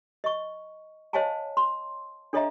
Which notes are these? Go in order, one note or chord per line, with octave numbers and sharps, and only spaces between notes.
D#5 C#6
C5 C#5 D#5 F5 G#5 A5
C6
D4 A4 C#5 D#5 E5 A#5